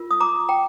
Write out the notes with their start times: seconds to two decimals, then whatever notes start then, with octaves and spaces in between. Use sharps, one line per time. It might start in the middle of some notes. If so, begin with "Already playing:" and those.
Already playing: F4 A#4
0.11 D#6
0.20 A#5 D6
0.49 G5 A#5